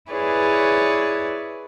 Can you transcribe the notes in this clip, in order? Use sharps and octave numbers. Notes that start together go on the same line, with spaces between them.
E4 G#4 B4 C#5 D5